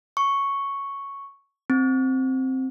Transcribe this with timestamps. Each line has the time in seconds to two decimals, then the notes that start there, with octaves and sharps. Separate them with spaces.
0.17 C#6
1.70 C4